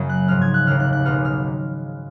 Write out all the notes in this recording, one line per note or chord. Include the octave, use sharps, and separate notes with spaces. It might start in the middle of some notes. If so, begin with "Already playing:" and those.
Already playing: F#2 C#3 F#3 A#3 C#4
F#6
G#2 F3 G#3 C#4 F6
G#6
F#6
F1 D#2 C#3 F6
F#6
F#6
B1 B2 G#3 B3 F6
F6